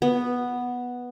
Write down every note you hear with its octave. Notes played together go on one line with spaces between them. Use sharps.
B3